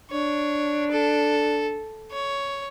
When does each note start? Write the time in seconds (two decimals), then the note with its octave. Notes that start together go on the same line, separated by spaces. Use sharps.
0.11 D4 C#5
0.91 A4
2.11 C#5